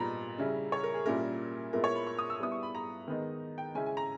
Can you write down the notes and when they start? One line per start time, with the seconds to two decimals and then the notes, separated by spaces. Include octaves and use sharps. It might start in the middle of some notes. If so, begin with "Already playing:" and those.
Already playing: A#2 G3 B3 D#4 A#5 B5
0.38 C#3 G3 C#4 E4
0.72 C#5
0.83 A#4
0.94 G#4
1.06 A#2 G3 A#3 C#4 E4 A#4
1.73 A#2 G#3 B3 E4 A#4
1.84 C#5
1.96 B5
2.07 C#6
2.19 D#6
2.30 E6
2.40 G3 B3 E4 D#6
2.52 C#6
2.63 B5
2.75 A#5
3.08 D#3 G#3 B3 D#4
3.58 G5
3.75 C#3 G#3 C#4 E4 G#5
3.86 G#5
3.97 A#5